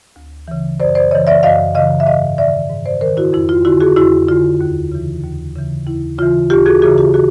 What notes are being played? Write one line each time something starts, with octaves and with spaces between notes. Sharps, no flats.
D2
C#3 E3
F#2 C5 D5
C5 D5
C#3 E3 C#5 D#5
D5 E5
F#2 D#5 F5
C#3 E3 D#5 F5
E5
G#2 D#5 F5
D#3 D5 E5
G#2
C5 D5
D#3 A#4 C5
E4 F#4
F2 E4
F4
D3 E4 F#4
F#4 G#4
F2 E4 F#4
D3 F4
D#2
C#3 E3
D#2
C#3 E3
D#2 E4
C#3 E3 F4
D#2 F4 G4
F#4 G#4
C#3 E3 F#4 G#4
F4 G4
F#4 G#4